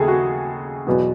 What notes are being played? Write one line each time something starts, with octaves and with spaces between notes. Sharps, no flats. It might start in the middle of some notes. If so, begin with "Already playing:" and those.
Already playing: D#2 C#3 A3 G#4 A4
F#4
E2 B2 F#3 B3